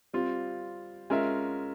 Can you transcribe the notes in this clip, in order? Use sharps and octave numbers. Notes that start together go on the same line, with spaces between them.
G3 C4 F4
G#3 C#4 F4 A#4 E5